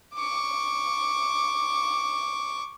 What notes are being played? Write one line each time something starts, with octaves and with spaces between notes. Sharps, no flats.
C#6 D6